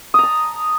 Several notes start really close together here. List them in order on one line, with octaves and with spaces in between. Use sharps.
D#6 A#5 A5